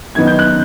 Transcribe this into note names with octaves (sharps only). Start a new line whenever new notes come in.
F#2 D#3 F#3 B3 D#4 G#6
G6
F#6